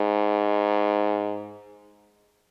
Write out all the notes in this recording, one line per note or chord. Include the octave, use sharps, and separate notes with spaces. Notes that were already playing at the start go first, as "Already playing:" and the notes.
Already playing: G#2